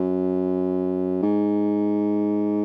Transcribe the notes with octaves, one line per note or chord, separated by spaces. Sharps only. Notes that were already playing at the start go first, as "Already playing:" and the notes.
Already playing: F#2
G#2